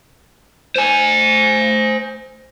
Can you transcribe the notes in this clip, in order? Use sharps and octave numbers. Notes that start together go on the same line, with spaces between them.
C5 G#5